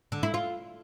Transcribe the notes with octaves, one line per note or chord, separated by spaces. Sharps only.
D3
E4
F4